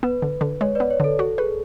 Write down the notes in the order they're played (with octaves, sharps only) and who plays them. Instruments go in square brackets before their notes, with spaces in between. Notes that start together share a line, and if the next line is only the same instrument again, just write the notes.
[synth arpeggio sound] B3 [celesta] B4
[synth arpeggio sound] D3
D3
[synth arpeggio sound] G#3 [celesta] C#5
[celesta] B4 D5
[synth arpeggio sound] B3
[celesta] C#5
[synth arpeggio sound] D3 [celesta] A4
[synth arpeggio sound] F#4 [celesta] A4
[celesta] G#4 [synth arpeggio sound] B4